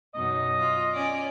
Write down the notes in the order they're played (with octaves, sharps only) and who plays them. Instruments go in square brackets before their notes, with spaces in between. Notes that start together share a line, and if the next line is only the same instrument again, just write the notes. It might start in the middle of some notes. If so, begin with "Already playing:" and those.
[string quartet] F#2 B2 D#4 [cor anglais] D#5
[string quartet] F4
C#4 D5